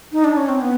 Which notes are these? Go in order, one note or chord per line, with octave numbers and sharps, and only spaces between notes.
D#4
D4
C#4
C4
B3